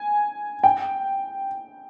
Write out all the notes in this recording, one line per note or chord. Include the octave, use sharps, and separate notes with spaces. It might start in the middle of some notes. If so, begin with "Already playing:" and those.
Already playing: G#5
G5